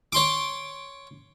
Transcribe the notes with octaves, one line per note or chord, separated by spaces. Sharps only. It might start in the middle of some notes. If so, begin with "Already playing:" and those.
C#5 C6 D6